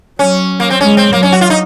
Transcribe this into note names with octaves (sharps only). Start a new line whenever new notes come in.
F#3 C#4
A#3
C4
G#3 C#4
C4
F#3 A#3
C#4
F#4
F4
D#4